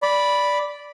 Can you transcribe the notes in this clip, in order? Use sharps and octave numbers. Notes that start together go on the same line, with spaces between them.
D5 B5